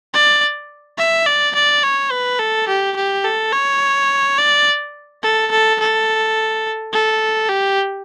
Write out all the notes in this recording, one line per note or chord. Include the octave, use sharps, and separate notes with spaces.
D5
E5
D5
D5
C#5
B4
A4
G4
G4
A4
C#5
D5
A4
A4
A4
A4
G4